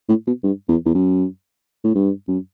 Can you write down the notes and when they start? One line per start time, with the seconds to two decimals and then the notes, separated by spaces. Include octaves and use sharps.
0.09 A2
0.27 B2
0.44 G2
0.69 E2
0.86 E2
0.94 F#2
1.84 A2
1.95 G2
2.28 F#2